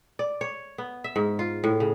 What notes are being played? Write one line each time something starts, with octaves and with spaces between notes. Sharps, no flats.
D5
C#5
B3
E5
G#2
F4
A2
C#3